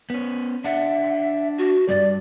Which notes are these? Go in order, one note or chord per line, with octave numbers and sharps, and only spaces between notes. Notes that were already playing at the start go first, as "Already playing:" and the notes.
B3 C#4
D4 E5 F#5
F#4
G2 A#2 G3 D5